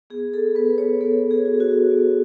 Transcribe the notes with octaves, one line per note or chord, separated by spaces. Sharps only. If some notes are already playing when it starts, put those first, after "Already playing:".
B3 G#4
A4
B3 B4
C#5
B3 A4
G#4
F#4
F#4
B3